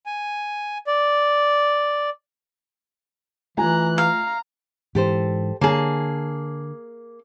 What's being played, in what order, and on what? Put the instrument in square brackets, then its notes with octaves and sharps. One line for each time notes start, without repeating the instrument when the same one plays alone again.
[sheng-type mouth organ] G#5
D5
[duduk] E3 [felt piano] A3 F4 G#5 [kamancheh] A#5 F#6
[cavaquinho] F5 [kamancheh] A#5
[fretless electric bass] G#2 E3 [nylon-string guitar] G4 A4 C5
[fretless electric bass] D3 [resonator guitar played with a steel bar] A#3 G#4 [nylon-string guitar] C#5 A5